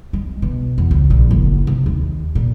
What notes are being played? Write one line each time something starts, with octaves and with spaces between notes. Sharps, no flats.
G#3
B2
E2
C#2
A#1
F#1
C3
D#2
A#2